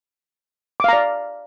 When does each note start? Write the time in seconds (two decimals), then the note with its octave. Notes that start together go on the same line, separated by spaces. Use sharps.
0.80 D6
0.84 F5
0.88 A#5
0.93 D5